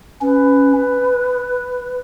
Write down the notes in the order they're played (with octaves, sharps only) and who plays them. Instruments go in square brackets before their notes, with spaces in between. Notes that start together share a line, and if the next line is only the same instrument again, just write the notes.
[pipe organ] C#4 [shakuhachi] B4